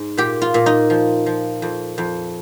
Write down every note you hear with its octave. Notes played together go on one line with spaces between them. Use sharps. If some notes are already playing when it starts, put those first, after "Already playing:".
Already playing: G#2
A#2 G4
F4
A#2
D#4
F3
F3
F2
F2